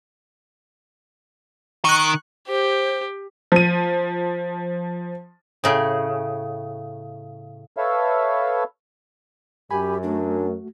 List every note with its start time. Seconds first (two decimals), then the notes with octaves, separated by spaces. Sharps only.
1.85 D#3 C#6 F#6
2.48 G4 C5
3.52 F3 D#7
5.64 A2 C#3
7.77 A4 B4 C#5 E5 F5
9.71 F#2 G4 G#5 B5
10.03 A3 D4 F#4